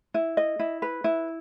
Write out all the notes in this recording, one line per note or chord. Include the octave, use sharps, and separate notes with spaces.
E4
D#5
E4
B4
E4